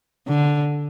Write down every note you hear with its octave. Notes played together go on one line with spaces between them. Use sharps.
D3